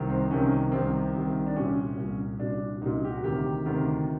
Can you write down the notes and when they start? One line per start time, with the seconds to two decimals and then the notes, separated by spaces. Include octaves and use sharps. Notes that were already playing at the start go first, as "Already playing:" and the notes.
Already playing: C2 C3 D#3
0.10 C4
0.30 C2 C3 D#3 C#4
0.72 C2 C3 D#3 C4
1.15 C2 C3 D#3
1.47 D4
1.56 C2 A#2 C#4
1.97 C2 A#2
2.39 C2 A#2 D4
2.81 C2 A#2 D#4
3.04 G4
3.10 F#4
3.24 D2 C3 D#3 G4
3.66 D2 C3 D#3